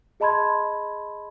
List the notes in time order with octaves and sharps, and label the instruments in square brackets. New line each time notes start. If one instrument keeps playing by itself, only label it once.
[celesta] G#4 D#5 A5 B5 C6 G#6